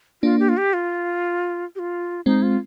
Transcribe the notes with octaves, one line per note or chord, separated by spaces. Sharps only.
A#3 D4 F4
G4
F4
G4
F4
G4
F4
G#3 C4 D#4
F4